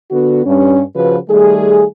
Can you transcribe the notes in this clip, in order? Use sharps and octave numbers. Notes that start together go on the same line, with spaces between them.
D3 B3 F#4
G2 C#4
C#3 F3 F#4 B4
D#3 G3 A3 G#4